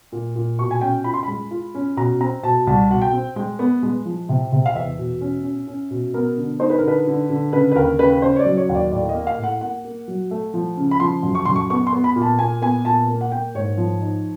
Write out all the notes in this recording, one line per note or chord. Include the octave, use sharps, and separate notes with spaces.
A#2
A#2
B2 C#6
G#5
C#4 G5
F4 B5
C6
B5
G#3
F4
C#4
B2 A#5
C4 A#5
B2 A5
C2 A5
B2 F#5
G5
C4
G#3
B3
G#3
F3
C3
C3
F5
E2 E5
B2
C#4
C#4
C#4
B2
B3 A#4
D3
D#4 C5
B4
A#4
D3 B4
D3
D3
C#3 B4
B4
D#2 A#4
C#3 B4
B4
C#3 C5
C#5
D5
F#3
C#5
D#2
D5
A2 D5
D#5
A#3
F5
A2
F#5
A#3 F#5
A#3
F#3
A3
F3
C#3
B5
F3 C6
F#2
C#6
F#2 C6
C#6
B3 C#6
C6
B3
B5
A#2
A5
A#2 G#5
B3 G#5
A#2 A5
A#3
F#5
A#3 G5
G#2 C#5
F3
D#4